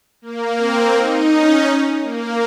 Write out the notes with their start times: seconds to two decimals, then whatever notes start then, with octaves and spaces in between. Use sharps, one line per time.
0.22 A#3
0.57 C4
0.94 D#4
1.30 C#4
2.01 A#3